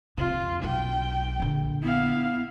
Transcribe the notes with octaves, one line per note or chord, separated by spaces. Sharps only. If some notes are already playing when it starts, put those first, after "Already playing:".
F2 C3 F4
B1 G5
A#1 D3
B3 E4 F5